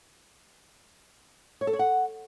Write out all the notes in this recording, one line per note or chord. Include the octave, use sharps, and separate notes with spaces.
C#5
A4
C#5
F#5